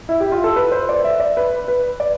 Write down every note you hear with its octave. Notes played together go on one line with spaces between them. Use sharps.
E4
G4
F4
A4
B4
C5
D5
E5
D5
B4
B4
D5